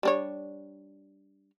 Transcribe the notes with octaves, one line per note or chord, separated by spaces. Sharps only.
G3 D4 C#5